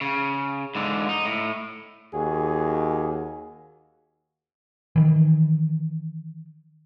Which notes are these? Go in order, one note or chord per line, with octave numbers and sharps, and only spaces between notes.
C#3
G#2 D3
D#4
A2
D#2 F#4 G#4
D#3 E3